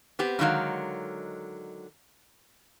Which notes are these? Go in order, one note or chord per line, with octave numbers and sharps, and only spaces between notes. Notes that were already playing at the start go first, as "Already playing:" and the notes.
B3 C4 G4
G2 D3 D#3 F#3 G#3 F5